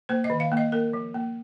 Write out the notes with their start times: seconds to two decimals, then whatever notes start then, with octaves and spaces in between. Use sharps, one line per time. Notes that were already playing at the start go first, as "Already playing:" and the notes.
0.09 A#3 C5
0.24 D#5
0.30 D#3
0.40 F5
0.52 A#3
0.57 D#5
0.72 A#3 A#4
0.93 F3
1.14 A#3